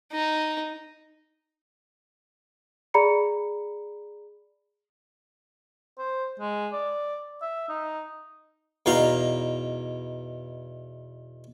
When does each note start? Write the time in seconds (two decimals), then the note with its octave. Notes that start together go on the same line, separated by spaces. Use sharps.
0.12 D#4
2.94 G#4 D5 A#5 B5 C#7
5.98 C5
6.39 G#3
6.73 D5
7.42 E5
7.69 D#4
8.86 E2 B2 D#4 F5 A#5